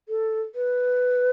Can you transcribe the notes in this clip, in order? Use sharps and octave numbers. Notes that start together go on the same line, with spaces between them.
A4
B4